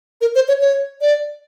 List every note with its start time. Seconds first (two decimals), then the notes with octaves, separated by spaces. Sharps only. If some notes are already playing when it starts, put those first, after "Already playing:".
0.21 A#4
0.35 C5
0.48 C#5
0.61 C#5
1.01 D5